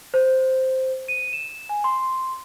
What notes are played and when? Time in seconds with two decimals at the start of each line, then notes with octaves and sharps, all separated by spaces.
0.14 C5
1.08 D#7
1.33 E7
1.69 G#5
1.84 C6